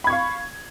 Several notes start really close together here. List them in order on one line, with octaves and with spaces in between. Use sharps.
B5 G#6 C#6 F5